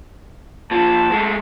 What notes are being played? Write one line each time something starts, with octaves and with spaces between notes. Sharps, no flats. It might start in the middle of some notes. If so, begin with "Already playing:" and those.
A#2 F3 A5
G#3 A3